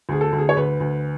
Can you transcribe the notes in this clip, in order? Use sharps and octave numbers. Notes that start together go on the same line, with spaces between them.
D2 G#4
A4
D2
G#4
C#5
D2 B4
D2